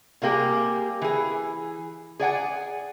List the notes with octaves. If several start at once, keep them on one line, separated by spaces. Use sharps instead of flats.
C3 G3 A#3 G4 G#4
E3 G#4
G#4 D5 F#5 G#5